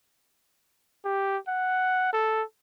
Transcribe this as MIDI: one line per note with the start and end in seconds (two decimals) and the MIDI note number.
1.05 1.38 67
1.48 2.11 78
2.13 2.43 69